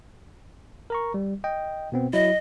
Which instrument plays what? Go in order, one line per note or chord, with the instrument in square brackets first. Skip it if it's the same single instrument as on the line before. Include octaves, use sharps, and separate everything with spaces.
[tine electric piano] A#4 A#5 C#6
G3
D#5 G5
B2 B3 C4
[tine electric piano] F#3 E4 [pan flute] D#5